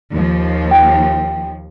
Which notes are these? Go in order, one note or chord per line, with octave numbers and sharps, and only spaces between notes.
D#2 F3
G5